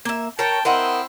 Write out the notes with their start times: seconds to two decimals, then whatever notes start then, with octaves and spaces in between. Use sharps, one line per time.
0.05 A#3 E5
0.39 A#4 C#5 G5 A5
0.65 C4 E4 A#4 D#5 F#5 C6